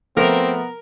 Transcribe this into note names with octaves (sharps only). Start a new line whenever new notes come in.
F3 A3 B3 C4 A#4